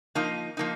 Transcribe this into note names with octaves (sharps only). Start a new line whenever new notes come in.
F3 A#3 D#4
F3 A#3 D#4